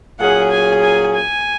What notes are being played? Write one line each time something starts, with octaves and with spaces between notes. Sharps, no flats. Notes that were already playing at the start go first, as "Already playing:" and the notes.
A#2 F#3 C#4 G#4 F#5
G#5
G#5
G#5